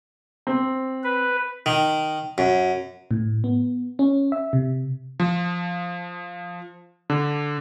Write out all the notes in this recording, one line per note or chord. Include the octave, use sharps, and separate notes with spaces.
C4
B4
D#3
F#2
A2
B3
C#4
E5
C3
F3
D3